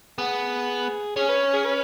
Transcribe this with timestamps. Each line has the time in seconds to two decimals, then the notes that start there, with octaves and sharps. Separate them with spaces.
0.18 B3 G#4
1.16 C#4 G#4
1.29 B4
1.53 G#4
1.65 B4